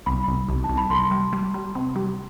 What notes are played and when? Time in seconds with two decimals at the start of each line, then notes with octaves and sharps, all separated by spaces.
0.06 C2 B5
0.28 C2
0.49 C2
0.64 A5
0.69 C2
0.77 B5
0.90 C2 C6
1.11 G3
1.33 G3
1.54 G3
1.75 C3
1.96 G3